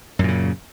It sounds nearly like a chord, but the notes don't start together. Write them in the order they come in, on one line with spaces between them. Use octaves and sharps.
F#2 A#2 C#3